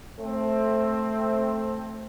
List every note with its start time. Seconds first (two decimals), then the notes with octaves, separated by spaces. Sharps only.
0.20 A3 C4